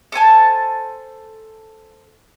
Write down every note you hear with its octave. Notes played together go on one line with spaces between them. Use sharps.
A4 C5 G#5 A5